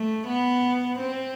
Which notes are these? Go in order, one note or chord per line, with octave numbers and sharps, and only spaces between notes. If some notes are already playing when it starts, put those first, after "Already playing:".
Already playing: A3
B3
C4